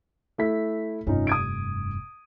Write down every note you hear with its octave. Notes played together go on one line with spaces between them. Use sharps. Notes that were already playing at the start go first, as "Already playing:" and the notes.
A3 E4 B6
F1 G2 C#4 D#4 F4
D#6 G#6 D7